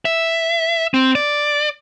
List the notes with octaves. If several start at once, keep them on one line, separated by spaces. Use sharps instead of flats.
E5
C4
D5